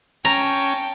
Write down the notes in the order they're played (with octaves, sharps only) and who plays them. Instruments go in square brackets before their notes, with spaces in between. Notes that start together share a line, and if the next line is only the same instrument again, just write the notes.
[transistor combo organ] C#4 [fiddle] G5 A5 [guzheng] A#5